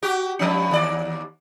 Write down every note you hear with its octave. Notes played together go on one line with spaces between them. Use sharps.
F#4 G4
G2 F3 C#4
D#2 D5